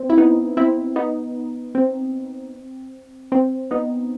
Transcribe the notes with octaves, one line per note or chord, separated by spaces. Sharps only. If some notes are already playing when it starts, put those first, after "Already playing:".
Already playing: C4
E4
B3 D#4
C4 E4
B3 D#4
C4
C4
B3 D#4